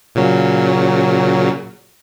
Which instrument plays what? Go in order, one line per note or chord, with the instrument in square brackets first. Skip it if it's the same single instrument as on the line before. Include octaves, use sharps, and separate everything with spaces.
[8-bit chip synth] A#2 C#3 F#3